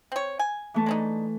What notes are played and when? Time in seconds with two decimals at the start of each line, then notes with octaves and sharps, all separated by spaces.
0.12 C4 C#5
0.39 G#5
0.74 E3 A3 A5
0.86 G#3 D4 D#4